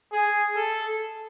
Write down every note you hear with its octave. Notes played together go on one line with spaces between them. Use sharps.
G#4
A4